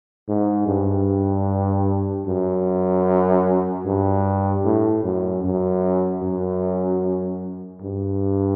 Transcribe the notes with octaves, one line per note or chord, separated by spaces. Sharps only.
G#2
G2
F#2
G2
A2
F#2
F#2
F#2
G2